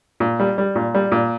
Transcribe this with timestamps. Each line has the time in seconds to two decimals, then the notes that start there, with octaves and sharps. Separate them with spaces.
0.20 A#2
0.40 G3
0.58 G3
0.76 A#2
0.95 G3
1.12 A#2